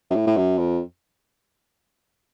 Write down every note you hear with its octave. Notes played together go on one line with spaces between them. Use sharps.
F#2
A2
A2
F#2
F2